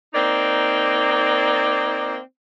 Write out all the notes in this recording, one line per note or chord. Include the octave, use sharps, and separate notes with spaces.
A#3 C4 D#4 D5